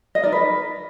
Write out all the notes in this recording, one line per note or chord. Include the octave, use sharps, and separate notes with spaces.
D#5
D#4 A#4 D5
B4